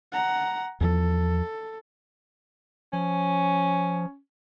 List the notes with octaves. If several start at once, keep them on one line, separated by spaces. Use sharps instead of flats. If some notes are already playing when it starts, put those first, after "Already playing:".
F#5 A#5
E2 F3 A4
F3 C#4